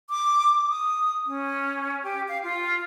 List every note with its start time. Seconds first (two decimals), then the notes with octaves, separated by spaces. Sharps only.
0.10 D6
0.68 D#6
1.26 C#4
2.03 G4
2.28 F5
2.43 F4